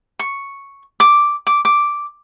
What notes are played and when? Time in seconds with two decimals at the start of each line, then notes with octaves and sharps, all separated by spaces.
0.19 C#6
1.00 D6
1.47 D6
1.65 D6